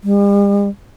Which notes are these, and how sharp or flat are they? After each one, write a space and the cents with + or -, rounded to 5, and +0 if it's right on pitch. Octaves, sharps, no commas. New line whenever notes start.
G3 +45